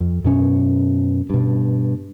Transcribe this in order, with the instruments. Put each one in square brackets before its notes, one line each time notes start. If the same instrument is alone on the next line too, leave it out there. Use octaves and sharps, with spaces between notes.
[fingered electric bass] F2
F#2 B2 C#4
G2 B2